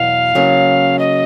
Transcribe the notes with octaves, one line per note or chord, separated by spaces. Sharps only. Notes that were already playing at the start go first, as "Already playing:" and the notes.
Already playing: E2 B2 F#3 F5
C#3 F#3 A#3 C#4
D#5